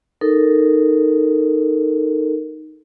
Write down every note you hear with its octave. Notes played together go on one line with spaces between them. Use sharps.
D#4 A4 A#4